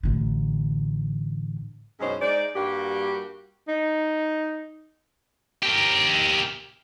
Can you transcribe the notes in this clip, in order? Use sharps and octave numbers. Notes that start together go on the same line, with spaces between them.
A1 D3
F#2 B2 G#3 C#4 D#4 C5
G#3 D#4 C5 D5
G2 G3 A#3 F#4 G4
D#4
G4 A#4